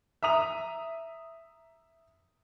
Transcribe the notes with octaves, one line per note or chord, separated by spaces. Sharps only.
E5 A#5 D#6 F7